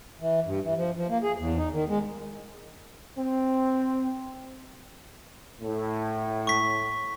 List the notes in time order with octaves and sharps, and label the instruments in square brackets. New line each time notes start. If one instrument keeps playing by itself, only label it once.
[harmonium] E3
G2
E3
F3
F3
A#3
G#4
E2
D#4
D#3
G#3
[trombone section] C4
[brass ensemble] A2
[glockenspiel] C#6 B6